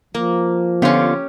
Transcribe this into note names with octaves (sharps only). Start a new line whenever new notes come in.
F3 A#3
D3 B3 C#4 F4 G4